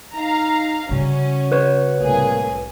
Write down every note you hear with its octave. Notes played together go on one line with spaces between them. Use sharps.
D#4 F5 A#5
C#3 G3 C#4 F#4
B4 C#5
C2 A2 A#3 G#4